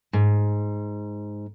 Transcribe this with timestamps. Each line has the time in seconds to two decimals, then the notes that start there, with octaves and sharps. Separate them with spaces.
0.13 G#2